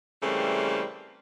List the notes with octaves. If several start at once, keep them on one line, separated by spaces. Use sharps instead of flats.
C#3 E3 G3 A3 A#3 C4